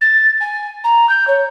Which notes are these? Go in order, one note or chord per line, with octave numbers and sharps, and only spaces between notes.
A6
G#5
A#5
G6
C#5